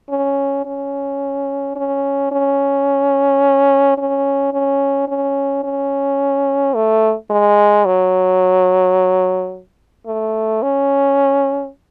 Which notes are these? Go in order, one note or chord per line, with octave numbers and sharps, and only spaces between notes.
C#4
C#4
C#4
C#4
C#4
C#4
C#4
C#4
A3
G#3
F#3
A3
C#4